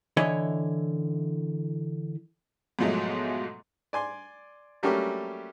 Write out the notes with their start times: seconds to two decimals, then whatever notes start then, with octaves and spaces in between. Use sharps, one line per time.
0.17 D3 E3 E4 C#5 D#5
2.79 G#2 B2 F3 F#3 G#3 A3
3.93 D5 G#5 C6
4.83 F#3 G3 A3 A#3 C#4 G4